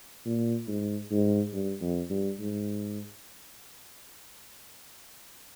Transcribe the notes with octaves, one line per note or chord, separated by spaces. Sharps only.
A#2
G#2
G#2
G2
F2
G2
G#2